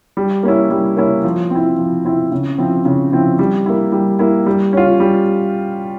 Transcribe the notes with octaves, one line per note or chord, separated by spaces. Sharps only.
G3
A#3 C#4 E4
G3
A#3 C#4 E4
F3
C4 E4
F3
C4 E4
C#3
F3 C4 E4
C#3
F3 C4 E4
G3
A#3 E4
G3
A#3 E4
G3
C#4 F4
G3